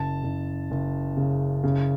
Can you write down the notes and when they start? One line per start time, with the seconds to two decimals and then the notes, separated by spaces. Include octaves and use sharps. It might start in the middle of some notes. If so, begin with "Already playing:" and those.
Already playing: F#1 A5
0.24 F#1
0.71 F#1
1.17 C#3
1.64 C#3